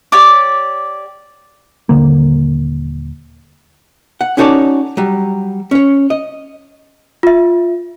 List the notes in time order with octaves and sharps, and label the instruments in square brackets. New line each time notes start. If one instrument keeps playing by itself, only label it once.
[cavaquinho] G4 C#5 D5 D6
[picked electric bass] D#1 D3 A#3
[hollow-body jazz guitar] F#5
C#4 D#4 F#4 A4 C#5 D5
F#3 G3
C#4 C#5
D#5
[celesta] F4 E5